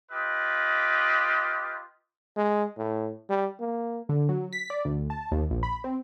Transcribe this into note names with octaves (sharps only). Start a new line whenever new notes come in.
F4 G4 B4 D#5
G#3
A2
G3
A#3
D3
F#3
B6
D5
D2
A5
D#2
A#1
B5
C4